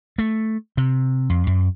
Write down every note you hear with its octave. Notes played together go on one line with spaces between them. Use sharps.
A3
C3
F2
F#2